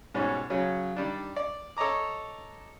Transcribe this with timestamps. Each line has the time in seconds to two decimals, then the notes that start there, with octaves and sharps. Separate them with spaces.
0.14 G#2 B2 G3 C#4
0.50 C#3 F#3 C#4
0.96 D#3 G3 D4
1.36 D5
1.77 A4 C#5 D#5 A#5 D6